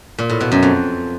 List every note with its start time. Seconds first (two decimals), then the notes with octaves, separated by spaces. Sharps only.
0.19 A#2
0.30 A2
0.41 B2
0.52 F#2
0.63 F2